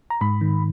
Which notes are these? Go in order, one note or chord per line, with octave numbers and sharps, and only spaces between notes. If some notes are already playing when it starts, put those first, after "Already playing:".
A#5
G#2 B5
D#3